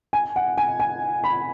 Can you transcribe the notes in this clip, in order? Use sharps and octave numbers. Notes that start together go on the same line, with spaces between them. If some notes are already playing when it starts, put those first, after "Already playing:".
G#5
F#5
G#5
G#5
B5